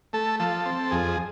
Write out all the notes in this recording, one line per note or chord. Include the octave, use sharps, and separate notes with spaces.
A3 A4
F3 A4
C4
F2 G#4